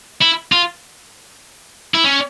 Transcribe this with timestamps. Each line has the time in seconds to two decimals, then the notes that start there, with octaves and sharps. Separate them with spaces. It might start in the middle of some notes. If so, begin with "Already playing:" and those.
0.21 E4
0.52 F4
1.95 E4
2.04 C#4